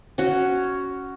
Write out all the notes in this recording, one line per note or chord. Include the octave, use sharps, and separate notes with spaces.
C#4 F#4